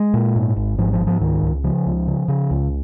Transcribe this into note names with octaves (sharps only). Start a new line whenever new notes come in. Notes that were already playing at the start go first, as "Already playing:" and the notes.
Already playing: G#3
A#2
G#2
G#1
G#2 F3
F3
G#2
F3
C#2 D#3
C#2
C#3 F3
C#2
C#3
C#3
C#2